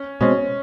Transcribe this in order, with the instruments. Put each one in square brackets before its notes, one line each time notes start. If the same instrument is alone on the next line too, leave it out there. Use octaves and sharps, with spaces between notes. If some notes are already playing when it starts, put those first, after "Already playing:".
Already playing: [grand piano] C#4
[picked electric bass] B2 G#3 C4 [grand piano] C#4